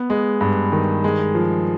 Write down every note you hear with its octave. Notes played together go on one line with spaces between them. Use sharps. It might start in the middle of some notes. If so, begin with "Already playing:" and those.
Already playing: B3
G#3
G2
D#3
G#3
F3